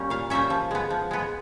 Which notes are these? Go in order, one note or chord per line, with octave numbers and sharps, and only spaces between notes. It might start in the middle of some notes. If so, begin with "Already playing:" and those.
Already playing: G3 A#3 C#4
A#2 F5
G3 A#3 C#4 E5
F3
G#3 B3
F3
G#3 B3